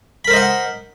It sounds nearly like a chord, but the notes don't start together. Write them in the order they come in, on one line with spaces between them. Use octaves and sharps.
B5 A#4 C5 D#5 F#5